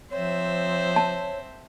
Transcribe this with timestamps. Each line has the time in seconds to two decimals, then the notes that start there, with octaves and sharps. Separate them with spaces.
0.11 F3 C4 C5 C#5 E5
0.96 A5